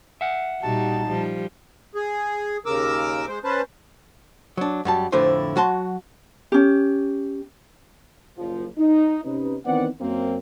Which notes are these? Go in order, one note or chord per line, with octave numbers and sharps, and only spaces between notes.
E5 F#5
A#2 G3 D#4 F#4 A5
F3 G3
G#4
D#2 C#3 A#4 D6 E6
G#3 C5
C#4 B4 C5 A5
F#3 D4
F#2 G3 A5
F2 A2 D3 E4 B4 C5
F#3 F#4 A5 C6
C#4 G4
F#1 F3
D#4
C3 C#4 D#4 B4
D#3 E3 B3 C4 D5 F#5
F#2 A#3 C4